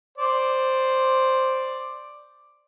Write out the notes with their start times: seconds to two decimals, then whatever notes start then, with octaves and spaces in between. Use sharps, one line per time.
0.18 C5 D5